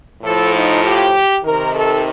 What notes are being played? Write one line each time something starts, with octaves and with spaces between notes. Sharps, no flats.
A2 F3 A4
D#4
G4
C3 D#3 A#4
A4